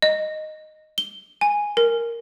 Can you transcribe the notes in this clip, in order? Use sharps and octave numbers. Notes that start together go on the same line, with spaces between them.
D#5
G7
G#5
A#4